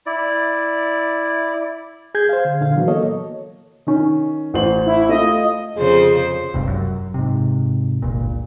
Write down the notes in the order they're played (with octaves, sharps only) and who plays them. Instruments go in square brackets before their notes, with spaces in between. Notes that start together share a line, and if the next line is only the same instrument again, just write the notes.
[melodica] E4 D5
[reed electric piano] G#4 G6 G#6
C5 F5
D3
A#2 D3 F5
E3 F#3 B3 F#4
A#3 A4 C#5 D#5
[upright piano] D#3 C#4
A1 C5 F#7
[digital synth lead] E4
[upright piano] A3 F4 [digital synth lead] D#5
[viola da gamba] F2 C#3 C5 [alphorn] G#4
[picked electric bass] G1 C#2 G2 C3
F#2
G#2 C3
G1 C#2 A#2